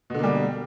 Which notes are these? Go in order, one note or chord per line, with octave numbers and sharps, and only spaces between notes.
B2 D3 G3 A#3